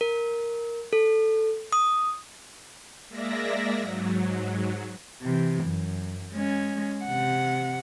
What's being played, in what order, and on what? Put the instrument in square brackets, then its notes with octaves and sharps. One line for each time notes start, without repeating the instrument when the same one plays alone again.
[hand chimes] A#4
A4
D#6
[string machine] G#3 A#3 D5 E5 A#6
G#2 F#3
[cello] C3 E3
F#2
G#3 C#4
C3 F#5